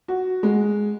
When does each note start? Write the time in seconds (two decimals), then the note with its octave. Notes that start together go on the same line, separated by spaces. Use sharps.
0.08 F#4
0.43 G#3